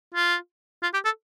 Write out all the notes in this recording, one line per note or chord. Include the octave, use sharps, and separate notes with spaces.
F4
F4
G4
A4